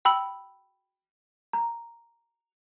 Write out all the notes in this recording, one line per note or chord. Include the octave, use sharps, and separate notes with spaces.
G5 B5 E6 F#7
A#5